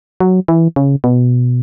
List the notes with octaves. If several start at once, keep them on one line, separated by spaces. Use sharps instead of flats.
F#3
E3
C#3
B2